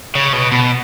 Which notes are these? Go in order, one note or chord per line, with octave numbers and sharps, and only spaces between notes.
C#3
B2
B2